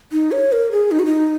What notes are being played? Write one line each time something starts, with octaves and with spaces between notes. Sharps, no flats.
D#4
C#5
A#4
G#4
D#4
F#4
D#4